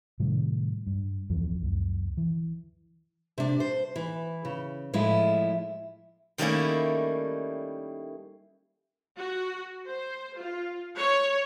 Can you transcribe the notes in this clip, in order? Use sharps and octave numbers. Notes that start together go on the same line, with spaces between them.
A2 C3 D#3 G3
G2
D1 F2 E3 F3
C#2 F#2
E3
C3 D4
C5
E3
C#3
A2 F3 G#3 E4
D#3 G3 A3 A#3 C#4 E4
F#4
C5
F4
C#5